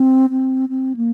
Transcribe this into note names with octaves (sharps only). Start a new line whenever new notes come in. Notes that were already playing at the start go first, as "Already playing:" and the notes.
Already playing: C4
C4
C4
A#3